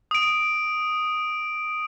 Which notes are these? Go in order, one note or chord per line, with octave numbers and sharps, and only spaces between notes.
D#6 D7